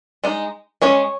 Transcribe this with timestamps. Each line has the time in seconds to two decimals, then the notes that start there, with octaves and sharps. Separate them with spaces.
0.24 G#3 D#4
0.82 G#3 C#4 C#5